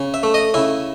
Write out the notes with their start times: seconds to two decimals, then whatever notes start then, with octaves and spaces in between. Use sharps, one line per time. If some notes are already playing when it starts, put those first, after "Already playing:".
Already playing: C#3
0.14 E5
0.23 A3
0.34 D#5
0.54 C#3 E4